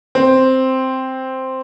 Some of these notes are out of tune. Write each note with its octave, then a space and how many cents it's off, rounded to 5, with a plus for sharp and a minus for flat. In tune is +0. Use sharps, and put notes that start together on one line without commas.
C4 +0